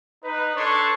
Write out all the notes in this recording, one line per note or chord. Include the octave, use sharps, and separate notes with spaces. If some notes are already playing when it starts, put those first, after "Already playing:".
D#4 B4
D4 A4 B4 C#5 C6 C#6